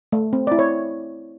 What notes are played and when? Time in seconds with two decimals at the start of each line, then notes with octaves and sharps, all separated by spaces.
0.12 A3
0.33 C4
0.47 E4 D5
0.59 C#5